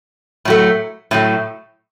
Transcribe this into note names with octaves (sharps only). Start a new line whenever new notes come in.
A2 F#3 A3
A2 F#3 A3